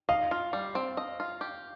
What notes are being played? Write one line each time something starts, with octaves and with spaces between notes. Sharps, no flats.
D#5 F5
F4
G3
C4
D#5
F4
G4